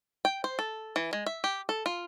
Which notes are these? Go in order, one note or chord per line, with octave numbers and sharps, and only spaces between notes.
G5
C5
A4
E3
G#3
E5
G4
A4
F4